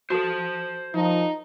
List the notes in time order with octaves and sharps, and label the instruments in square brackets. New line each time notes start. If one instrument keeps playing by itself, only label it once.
[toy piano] F#4 A4 [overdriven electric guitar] C5 A5
[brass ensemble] D#3 F3 [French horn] D#4